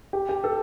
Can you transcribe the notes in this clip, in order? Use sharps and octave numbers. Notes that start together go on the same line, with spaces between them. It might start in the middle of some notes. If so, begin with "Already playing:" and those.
G4
G4
A4